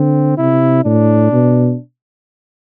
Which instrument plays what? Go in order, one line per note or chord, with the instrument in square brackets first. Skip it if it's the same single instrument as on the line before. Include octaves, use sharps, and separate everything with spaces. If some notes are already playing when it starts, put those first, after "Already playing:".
Already playing: [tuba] D3 [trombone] C4
[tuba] C3 [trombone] E4
[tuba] A2 [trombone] D4
[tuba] B2